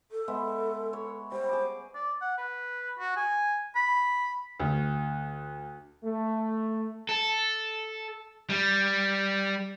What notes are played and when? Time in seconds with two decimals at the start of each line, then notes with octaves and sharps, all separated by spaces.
0.11 A4
0.28 G#3 B3 E5
0.93 C#5
1.32 G3 C5
1.49 G#4 D6
1.95 D5
2.22 F#5
2.38 B4
2.99 F#4
3.17 G#5
3.75 B5
4.60 D2
6.04 A3
7.09 A4
8.50 G3